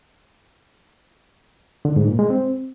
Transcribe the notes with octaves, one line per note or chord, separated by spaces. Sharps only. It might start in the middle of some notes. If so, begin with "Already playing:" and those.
D3
G#2
A#2
G#3
C4